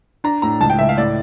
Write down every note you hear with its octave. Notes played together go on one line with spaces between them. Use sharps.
D4 A#5
A2 A#5
C#2 A5
G5
C#2 E5
F5
A2 D5